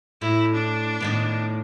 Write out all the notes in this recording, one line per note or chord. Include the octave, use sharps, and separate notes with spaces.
A2 E4
D4
A2 D#3 B3